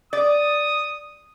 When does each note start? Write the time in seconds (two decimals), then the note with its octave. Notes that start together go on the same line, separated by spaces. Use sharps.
0.13 D5 D#6